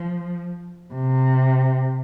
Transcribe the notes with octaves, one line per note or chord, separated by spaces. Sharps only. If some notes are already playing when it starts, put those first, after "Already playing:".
Already playing: F3
C3